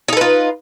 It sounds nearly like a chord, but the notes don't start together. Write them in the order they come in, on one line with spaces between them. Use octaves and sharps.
D#4 A4 B4 F4